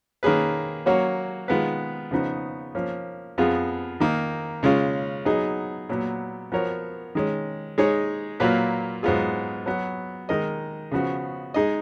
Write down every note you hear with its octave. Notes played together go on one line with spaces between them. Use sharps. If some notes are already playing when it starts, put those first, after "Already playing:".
D#3 A#3 C#4 G#4 B4
F#3 A#3 C#4 F#4 C#5
D#3 G#3 B3 F4 B4
C#3 F3 B3 D#4
F3 A#3 C#4
F2 F3 B3 F4 G#4
D#3 A#3 D#4
C#3 G#3 C#4 F4
F#3 B3 D#4 G#4 D#5
A#2 F#3 B3
F3 B3 F#4 A#4 C#5
D#3 G#3 C#4
G#3 D#4 G#4 C#5
A#2 F#3 A#3 F4 B4
G#2 F#3 B3 F4 G#4
F#3 B3 F#4
D#3 G#3 D#4 A#4 D#5
C#3 F3 B3 F#4
G#3 D#4 G#4 D#5